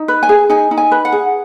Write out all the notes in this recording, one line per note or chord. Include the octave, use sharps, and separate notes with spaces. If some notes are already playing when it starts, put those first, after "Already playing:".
Already playing: D#4
B4
G#5
G#4
D#4 G#5
D#4
G#5
B4
F#5
G#4